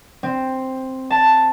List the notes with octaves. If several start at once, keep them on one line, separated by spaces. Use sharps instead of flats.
C4
A5